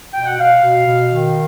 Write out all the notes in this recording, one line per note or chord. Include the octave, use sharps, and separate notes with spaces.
B2 G5
F#5
B2 F5
B2
B2
D#3